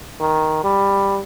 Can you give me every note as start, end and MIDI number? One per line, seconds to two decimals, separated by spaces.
0.20 0.62 51
0.64 1.21 55